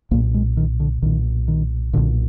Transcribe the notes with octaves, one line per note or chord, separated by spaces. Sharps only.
B1 A#2 A#3
G#3
D#3
D3
B1 A#2 D#3
D#3
B1 A#2 D3